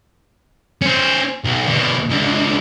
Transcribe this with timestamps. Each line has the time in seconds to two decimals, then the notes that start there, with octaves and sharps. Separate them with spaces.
0.81 C#4 C5
1.44 B1
1.67 B2 D3
2.09 C#2 D3